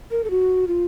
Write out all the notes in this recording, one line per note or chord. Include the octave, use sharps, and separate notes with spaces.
A#4
A4
F#4
F4